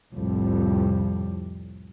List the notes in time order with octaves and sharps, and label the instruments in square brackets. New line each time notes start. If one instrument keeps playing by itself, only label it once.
[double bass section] C2 F2 A2 G3